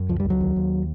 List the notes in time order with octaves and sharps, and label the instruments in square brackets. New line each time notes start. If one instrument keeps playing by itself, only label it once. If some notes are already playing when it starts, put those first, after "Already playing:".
Already playing: [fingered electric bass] F#2
C#2 F3
G3
C#2
F#3
D#2
D#2